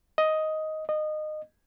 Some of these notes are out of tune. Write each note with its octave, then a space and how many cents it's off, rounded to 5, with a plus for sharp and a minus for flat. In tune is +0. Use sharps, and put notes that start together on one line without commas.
D#5 +10
D#5 -20